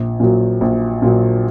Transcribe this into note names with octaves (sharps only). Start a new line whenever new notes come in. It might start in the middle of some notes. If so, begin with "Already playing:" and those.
Already playing: A#1
A#2 F#3
A#1
A#2 F#3